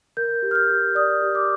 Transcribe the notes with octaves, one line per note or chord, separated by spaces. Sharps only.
A#4 G6
G4
F6
G6
G4
D5 D#6
G4
D6